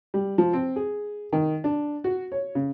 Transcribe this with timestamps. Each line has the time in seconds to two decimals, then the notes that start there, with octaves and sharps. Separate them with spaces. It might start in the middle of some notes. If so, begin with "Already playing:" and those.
0.14 G3
0.38 F3
0.53 C4
0.76 G#4
1.33 D#3
1.64 D4
2.04 F#4
2.32 C#5
2.55 C#3